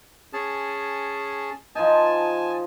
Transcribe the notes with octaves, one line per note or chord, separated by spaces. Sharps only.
C#4 G#4 A5
F3 D#4 G#5 A5